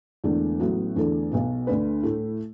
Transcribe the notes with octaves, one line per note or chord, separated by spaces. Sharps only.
E1 E2 D3 A3 D4
A1 A2 F#3 B3 F#4
E2 D3 A3 D4 A4
B1 B2 B3
D2 D3 A3 D4 B4
A2 A3 E4